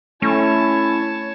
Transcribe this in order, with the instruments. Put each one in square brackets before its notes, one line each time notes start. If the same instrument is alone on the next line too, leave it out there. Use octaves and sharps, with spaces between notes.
[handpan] A3 [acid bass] C#4 [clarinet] E4 [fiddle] C#5 A5